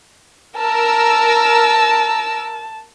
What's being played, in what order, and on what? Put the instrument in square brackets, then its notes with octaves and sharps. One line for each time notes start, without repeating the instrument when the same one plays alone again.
[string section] A#4 E6 [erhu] A5